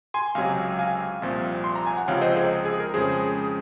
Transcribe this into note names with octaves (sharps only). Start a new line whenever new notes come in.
G#5 C6
C#2 C3 F#3 F5 G#5
F5 G#5
C2 A#2 F3 C4
C6
A#5
G#5
F#5
C#2 C3 F3 C4 C#5 F5
C5 D#5
G#4 C5
G#4
A#4
F2 C#3 G#3 C#4 G#4 C5